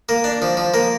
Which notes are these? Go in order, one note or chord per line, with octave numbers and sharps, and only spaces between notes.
A#3
D4
F3
F3
A#3